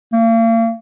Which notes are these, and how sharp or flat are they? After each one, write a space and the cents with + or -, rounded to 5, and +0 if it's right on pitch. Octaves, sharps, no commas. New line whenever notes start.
A#3 -40